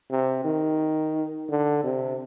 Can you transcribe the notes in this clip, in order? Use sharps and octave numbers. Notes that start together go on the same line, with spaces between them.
C3
D#3
D3
C3